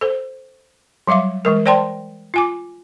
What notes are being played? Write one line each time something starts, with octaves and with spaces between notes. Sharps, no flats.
A4 C5
F#3 G3 E5 F5 D6
E3 G#3 A#4
C5 D5 G5 A5 C6
F4 G#5 D6